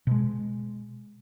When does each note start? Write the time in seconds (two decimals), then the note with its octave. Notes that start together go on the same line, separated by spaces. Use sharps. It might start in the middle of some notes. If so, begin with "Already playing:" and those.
0.07 B2 G#3